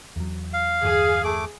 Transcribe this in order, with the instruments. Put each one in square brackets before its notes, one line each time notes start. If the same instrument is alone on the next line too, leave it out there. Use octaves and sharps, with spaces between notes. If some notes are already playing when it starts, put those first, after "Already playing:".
[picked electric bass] E2 F#3
[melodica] F5
[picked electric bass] G1 E2 [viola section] G#4
[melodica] A3 D6